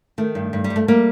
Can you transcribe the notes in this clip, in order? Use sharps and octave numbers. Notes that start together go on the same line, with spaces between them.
D#3 A3
G2
G2
G3
G2
A3
G3 A#3